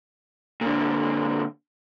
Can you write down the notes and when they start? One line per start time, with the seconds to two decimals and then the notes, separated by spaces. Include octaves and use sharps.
0.61 A#2 D3